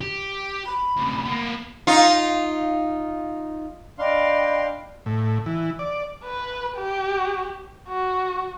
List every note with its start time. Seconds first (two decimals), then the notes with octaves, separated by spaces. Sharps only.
0.01 G4
0.66 B5
0.97 D2 C3
1.25 A#3 B3
1.87 D#4 F4
3.99 D4 D#5 F5 G5 B5 C6
5.06 A2
5.46 E3
5.79 D5
6.25 B4
6.77 G4
7.89 F#4